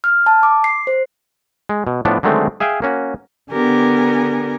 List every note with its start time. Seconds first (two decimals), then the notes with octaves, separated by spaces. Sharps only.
0.04 F6
0.26 A5
0.43 D6
0.64 C7
0.87 C5
1.69 G#3
1.87 B2
2.05 A2 F3 B3 D4
2.23 D3 D#3 F#3 G#3 A3 C4
2.60 G#4 E5 F5 G5 G#5
2.82 A#3 C#4 F#4
3.50 D3 B3 G4 A#4 G#5